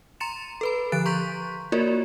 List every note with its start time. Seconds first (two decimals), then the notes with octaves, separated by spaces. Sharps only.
0.20 A#5 C6 A6 C#7 E7
0.61 A4 B4 B5
0.92 D3 F3 F#6 A6 D7
1.05 A#5 C6 C#6 G6 B6
1.72 A#3 F4 F#4 A#4 C#5 D5